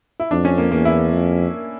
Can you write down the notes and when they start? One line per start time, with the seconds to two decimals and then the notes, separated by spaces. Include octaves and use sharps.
0.20 E4
0.31 F2 D4
0.45 C#4
0.58 A#3
0.72 E2 A#3
0.85 E4
1.12 F2